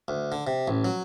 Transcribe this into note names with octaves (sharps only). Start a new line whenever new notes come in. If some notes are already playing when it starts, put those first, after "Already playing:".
D2
D3
C3
A1
F#3